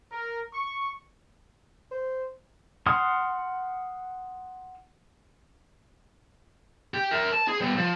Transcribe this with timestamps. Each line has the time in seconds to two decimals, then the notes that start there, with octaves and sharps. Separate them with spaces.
0.12 A#4
0.54 C#6
1.91 C5
2.86 F#5 C6 D#6 F6
6.94 G4
7.11 A#4 E5
7.32 A5
7.48 G#4
7.61 G3 B3
7.77 F3